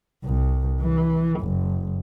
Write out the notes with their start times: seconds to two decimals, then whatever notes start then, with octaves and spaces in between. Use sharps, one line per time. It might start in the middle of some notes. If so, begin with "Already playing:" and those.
0.25 C2
0.81 E3
1.41 F#1